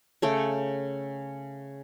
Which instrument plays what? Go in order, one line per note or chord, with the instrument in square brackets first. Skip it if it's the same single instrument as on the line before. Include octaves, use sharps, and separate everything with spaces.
[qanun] C#3 A3 G5